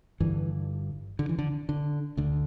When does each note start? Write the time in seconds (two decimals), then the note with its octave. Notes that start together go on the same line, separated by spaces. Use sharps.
0.20 G1 G2 D3 E3
1.19 D3
1.29 E3
1.39 D3
1.69 D3
2.17 D2 D3